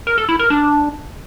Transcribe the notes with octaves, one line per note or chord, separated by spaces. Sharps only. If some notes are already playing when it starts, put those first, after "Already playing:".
A#4
A4
E4
A#4
D4